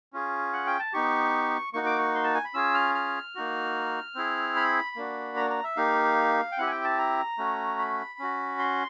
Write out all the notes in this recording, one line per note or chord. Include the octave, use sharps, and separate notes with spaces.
C#4 F4 G#4
F#5
G5
A5
B3 D#4 G4 C#6
A#3 D#4 F#4 C#6
D6
C#6
C6
A5
G#5
B5
C#4 F4 G#4 E6
F6
F6
A#3 D#4 F#4
C4 E4 G#4
B5
A#3 D4 F#4
A#5
A#5
E5
A#3 D#4 G4 F5
G5
C4 E4 G4 F#5
G#5
G5
A5
A#5
A3 C#4 F#4
B5
C#4 F#4
C6